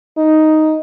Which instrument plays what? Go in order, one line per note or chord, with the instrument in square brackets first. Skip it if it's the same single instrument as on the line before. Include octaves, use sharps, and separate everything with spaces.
[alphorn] D#4